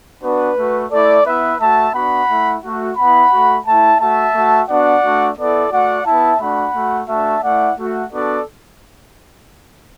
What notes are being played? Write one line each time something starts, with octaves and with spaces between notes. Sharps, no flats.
B3 D4 F#4 B4
A3 F#4
A3 E4 A4 D5
B3 E4 B4 E5
A3 F#4 E5 A5
B3 D4 F#4 F#5 B5
A3 E4
A3 F#4
B3 E4 F#5 B5
A3 F#4
A3 E4 E5 A5
A3 F#4 E5 A5
A3 F#4
B3 D4 F#4 D5 F#5
A3 D4 F#4
B3 E4 A4 D5
A3 F#4 D5 F#5
B3 E4 E5 A5
A3 D4 F#4 F#5 B5
A3 F#4
A3 D4 F#4 E5 A5
A3 E4 D5 F#5
A3 F#4
B3 D4 F#4 A4 D5